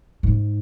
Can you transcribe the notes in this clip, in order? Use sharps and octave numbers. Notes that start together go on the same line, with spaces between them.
G#2